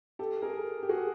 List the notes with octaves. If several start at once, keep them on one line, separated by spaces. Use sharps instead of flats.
G4 A4
G#4 A#4
G4
F#4 G#4